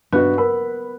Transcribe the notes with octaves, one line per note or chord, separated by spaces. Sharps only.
G2 B3 F#4 B4
A#4 B5